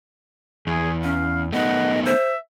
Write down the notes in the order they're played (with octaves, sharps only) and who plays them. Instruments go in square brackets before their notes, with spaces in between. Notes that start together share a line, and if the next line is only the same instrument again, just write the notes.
[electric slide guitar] E2 [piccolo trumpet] G#4
[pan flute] C#4 [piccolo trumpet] F5
[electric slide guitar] A3 B3 D#4 [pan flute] D#5 [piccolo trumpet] F#5
[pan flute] C5 [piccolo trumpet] E5